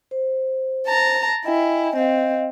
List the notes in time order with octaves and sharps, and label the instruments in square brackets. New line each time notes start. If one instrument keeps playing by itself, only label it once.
[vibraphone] C5
[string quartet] A5 A#5
[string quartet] E4 [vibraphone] D#5 G5 G#5
[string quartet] C4 [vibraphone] D#5 F5